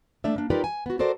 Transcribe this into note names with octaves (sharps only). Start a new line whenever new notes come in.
A3 A#3 D4 D5 E5
A#3 D4
D#4 F4 G4 A#4 B4 D5
G#5
B3 F#4
F#4 A4 A#4 C5 D5